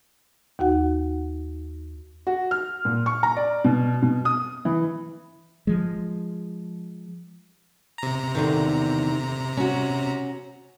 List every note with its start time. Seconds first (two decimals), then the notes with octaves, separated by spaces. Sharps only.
0.59 D#2 D#4 F#4 F#5
2.27 F#4
2.51 F6
2.85 A#2
3.06 C#6
3.23 A#5
3.37 D5
3.64 B2
4.02 B2
4.25 D#6
4.65 E3
5.67 F3 G#3
7.98 C3 A#5
8.35 E2 D3 D#3
9.57 C#4 F#4